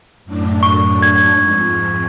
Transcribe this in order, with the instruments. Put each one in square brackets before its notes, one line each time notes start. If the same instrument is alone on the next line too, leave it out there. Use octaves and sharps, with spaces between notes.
[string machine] F#2 A2 D4
[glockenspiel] C#6
G#6
[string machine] F2 G#2